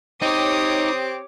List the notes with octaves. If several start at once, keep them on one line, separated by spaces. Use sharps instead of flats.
C4 D#4 G4 C#5 D6 D#6